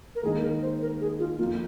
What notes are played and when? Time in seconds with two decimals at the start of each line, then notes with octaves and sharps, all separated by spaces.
0.15 A#4
0.23 D#2 D#3 G#3 D#4 G#4
0.43 A#4
0.62 C5
0.82 A#4
1.00 G#4
1.19 F4
1.38 F2 F3 A#3 F4